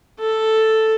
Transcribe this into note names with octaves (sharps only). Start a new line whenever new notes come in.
A4